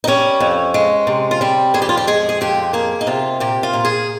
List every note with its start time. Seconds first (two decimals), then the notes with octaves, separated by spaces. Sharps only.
0.04 D#4
0.07 G3 C#4
0.40 F2
0.74 G#3
1.07 C3
1.31 F4
1.41 G3 G4
1.74 F2 G#4
1.82 G4
1.89 F4
1.97 G4
2.07 G#3 G#4
2.29 G#4
2.41 F2 G4
2.73 A#3 G#4
3.01 D#4
3.07 C3 F4
3.40 A#2 G4
3.63 F4
3.73 A#2
3.85 G#4